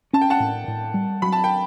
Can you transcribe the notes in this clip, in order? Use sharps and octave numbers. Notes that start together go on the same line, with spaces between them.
C#4 A5
G5
F#5 A5
A2
A2
G3
F#3 B5
A5
G5